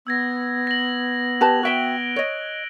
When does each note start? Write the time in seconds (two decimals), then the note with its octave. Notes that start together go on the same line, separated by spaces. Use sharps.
0.07 B3 E6 G#6 A#6
0.67 A#6 F#7
1.41 G4 B4 A5 A#6 F7
1.63 F#4 E5 G5 F#6 D7 G7
2.16 C#5 D#5